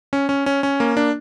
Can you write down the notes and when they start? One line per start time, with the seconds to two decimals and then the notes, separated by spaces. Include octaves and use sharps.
0.13 C#4
0.29 C#4
0.46 C#4
0.63 C#4
0.80 A#3
0.97 D4